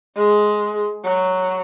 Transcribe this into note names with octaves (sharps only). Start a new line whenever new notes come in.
G#3
F#3